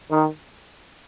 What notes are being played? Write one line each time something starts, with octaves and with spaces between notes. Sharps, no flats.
D#3